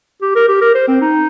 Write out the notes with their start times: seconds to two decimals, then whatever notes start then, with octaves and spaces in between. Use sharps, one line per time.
0.22 G4
0.35 A#4
0.48 G4
0.61 A#4
0.75 C5
0.88 C4
1.01 D#4